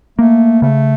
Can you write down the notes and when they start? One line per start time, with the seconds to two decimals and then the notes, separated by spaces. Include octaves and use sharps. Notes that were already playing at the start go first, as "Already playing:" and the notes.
0.19 A3 A#3
0.62 C#3 A3